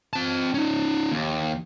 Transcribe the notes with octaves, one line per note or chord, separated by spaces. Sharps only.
C4 A5
C#4 D#4
D#2